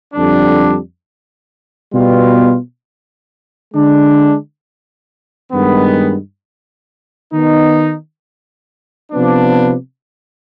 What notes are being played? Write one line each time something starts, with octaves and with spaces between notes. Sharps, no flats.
F2 D3 G3 D4
B2 G3 B3 F4
D3 G#3 D4
G2 D#3 G#3 B3
D#3 B3 D#4
C3 F3 B3 D4